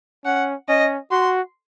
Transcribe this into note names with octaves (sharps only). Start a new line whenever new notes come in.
C#4 F#5
C#4 D#5
F#4 C6